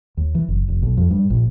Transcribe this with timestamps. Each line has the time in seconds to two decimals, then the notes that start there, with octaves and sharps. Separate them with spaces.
0.17 D#2
0.35 E3
0.48 F#1
0.68 F1
0.82 B1
0.97 F2
1.11 G2
1.30 A#1